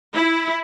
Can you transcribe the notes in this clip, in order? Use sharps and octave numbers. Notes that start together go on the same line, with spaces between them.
E4